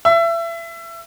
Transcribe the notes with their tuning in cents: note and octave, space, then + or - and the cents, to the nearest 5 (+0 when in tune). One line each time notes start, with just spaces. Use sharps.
E5 +30